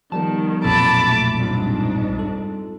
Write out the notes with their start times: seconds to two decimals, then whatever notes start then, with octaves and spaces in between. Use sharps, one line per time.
0.12 D#3 F3 G3 B3 A5
0.64 B1 F2 A#2 C4 A4 A5 B5 D6
1.07 A3
1.39 G#2 G3 C4 D4 F4
2.19 A4